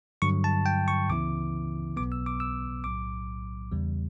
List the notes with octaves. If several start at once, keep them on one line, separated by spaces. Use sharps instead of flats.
G2 D3 F#3 C#6
A5
G5
C#6
C#2 C#3 E3 B3 E4 D6
B1 B2 F#3 B3 D6
E6
D6
E6
B1 A2 F#3 D6
E2 C#3 G3